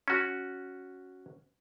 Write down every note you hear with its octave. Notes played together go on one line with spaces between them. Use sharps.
C#4 F#4